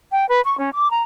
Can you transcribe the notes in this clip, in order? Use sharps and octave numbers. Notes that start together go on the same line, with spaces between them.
G5
B4
C#6
C#4
D6
A#5